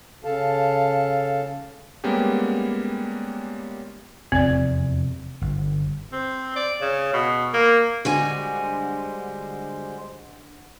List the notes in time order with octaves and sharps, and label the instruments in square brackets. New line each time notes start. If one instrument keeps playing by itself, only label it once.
[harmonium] C#3 A4 F5 A5
[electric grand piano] G3 G#3 A#3 B3 C#4 G4
[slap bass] F1 E2 [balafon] C4 D5
[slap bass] G1
[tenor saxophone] C4
D5
C#3
B2
A#3
[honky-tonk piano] D3 [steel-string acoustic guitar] G3 F#4 G#5 [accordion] G#3 C5